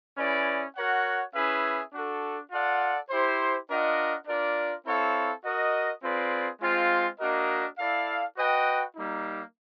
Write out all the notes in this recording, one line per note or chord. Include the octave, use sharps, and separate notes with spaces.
C#4 E4 G#4 B4 D5
F#4 A#4 C#5 F#5
C#4 E4 G#4 B4 E5
D4 F#4 A4
F4 A4 D5 F#5
E4 G4 C5
D4 F4 A#4 D#5 F#5
D4 F4 A#4 D5
C4 E4 A4 C#5 F5
F#4 A#4 D#5
C4 F4 G#4 B4 D5
G#3 C4 F4
A#3 D4 F#4 A#4 D#5
E4 A4 D5 F5
F#4 B4 D#5 G5
G3 A#3 D#4